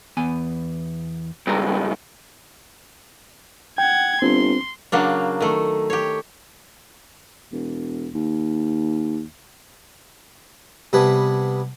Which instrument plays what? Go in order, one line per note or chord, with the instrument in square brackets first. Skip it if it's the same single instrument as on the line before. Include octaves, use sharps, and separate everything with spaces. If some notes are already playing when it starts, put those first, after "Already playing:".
[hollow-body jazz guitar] E2 B3 G#5
[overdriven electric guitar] C#2 G2 [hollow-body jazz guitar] G#4 A#5
[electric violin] F#5 G#6 [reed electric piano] G5
[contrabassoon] G1 [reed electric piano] C4 [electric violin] C6
[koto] C#3 F#3 A#3 D4
D#3 A3
G4 C#5
[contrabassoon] E1
D#2
[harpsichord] C3 G3 B3 B4 G#5 A5